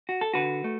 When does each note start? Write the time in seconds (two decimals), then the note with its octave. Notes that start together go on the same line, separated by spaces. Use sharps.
0.09 F#4
0.21 A4
0.34 D3 F#4 B4
0.64 A3